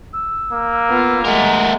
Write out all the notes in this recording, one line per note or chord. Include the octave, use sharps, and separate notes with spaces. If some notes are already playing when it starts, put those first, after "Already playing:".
E6
A#3
B3 F4
G#3 A3 A#4 F#5